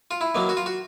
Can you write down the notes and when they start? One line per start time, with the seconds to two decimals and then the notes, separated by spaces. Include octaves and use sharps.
0.11 F4
0.21 E4
0.35 D#3 F#3 A#3
0.49 F#4
0.57 F4
0.66 F#4